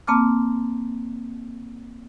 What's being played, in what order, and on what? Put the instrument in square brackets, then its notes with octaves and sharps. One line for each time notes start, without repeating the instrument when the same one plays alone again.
[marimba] A#3 C4 A5 D6 F6